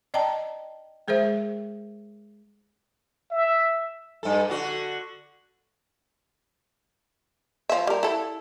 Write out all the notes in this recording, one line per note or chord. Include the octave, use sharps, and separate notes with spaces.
D5 D#5 G5 A5 A#5
G#3 G#4 A#4 C5 E5
E5
G2 A4
D3 F#4
F3 E5
G3 A#4
E4 A4